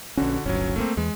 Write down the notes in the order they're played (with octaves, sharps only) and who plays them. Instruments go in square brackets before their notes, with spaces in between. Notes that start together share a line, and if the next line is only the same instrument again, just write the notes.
[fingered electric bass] A#1 C#4 [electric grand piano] D3 F#4
[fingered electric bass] D1 G1 [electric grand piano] F#3 C#4
[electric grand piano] A3 A#3 C4
[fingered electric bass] E2 [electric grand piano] G#3